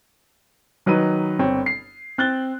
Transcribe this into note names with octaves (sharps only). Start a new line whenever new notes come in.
D#3 F#3 D#4 B4 D#7
G1 C4 C#5
C7
C4 F#6 A6 G7